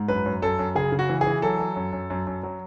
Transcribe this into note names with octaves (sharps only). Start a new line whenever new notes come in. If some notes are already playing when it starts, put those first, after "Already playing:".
Already playing: G#2
F#2 B4
F#2
F#2 A4
F#2
C#3 G#4
C#3
F#4
E3
G#4
E3
F#3 A4
F#3
F#2
F#2
F#2
F#2
F#3